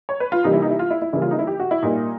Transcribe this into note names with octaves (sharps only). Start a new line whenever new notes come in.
C#5
B4
F4
C3 E3 G3 A#3 D#4
E4
D#4
E4
F4
E4
E4
C#3 E3 G3 A#3 E4
F4
D#4
E4
G4
F#4
E4
A#2 G3 A#3 D#4